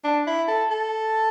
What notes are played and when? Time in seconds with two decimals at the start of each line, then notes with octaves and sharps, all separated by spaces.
0.04 D4
0.27 E4
0.48 A4
0.71 A4